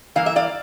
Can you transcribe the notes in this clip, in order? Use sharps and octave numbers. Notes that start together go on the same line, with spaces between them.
G2 E3 A#3 E4 F5
E5
D5 F5